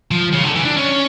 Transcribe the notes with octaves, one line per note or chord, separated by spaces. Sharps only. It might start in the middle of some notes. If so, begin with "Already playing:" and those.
F3
C#3
D3
E3
D4
C#4